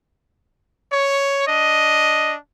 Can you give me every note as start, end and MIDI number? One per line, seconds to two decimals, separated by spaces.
0.93 1.44 73
1.48 2.36 62
1.48 2.36 75